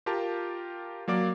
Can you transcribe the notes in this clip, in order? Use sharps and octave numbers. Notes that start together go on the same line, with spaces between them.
F4 G4 A#4 A5
F#3 A#3 D5 D6